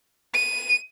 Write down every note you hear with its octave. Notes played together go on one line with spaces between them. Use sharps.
D#7